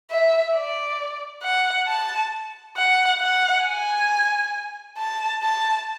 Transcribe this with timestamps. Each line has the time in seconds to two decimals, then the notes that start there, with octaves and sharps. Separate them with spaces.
0.11 E5
0.55 D5
1.43 F#5
1.88 A5
2.77 F#5
3.21 F#5
3.65 G#5
4.98 A5
5.42 A5